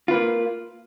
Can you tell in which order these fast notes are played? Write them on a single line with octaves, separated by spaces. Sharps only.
F4 B4 A#3